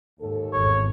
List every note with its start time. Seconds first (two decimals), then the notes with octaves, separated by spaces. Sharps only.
0.20 D#2 G#2 A4
0.53 G#1 E2 C#5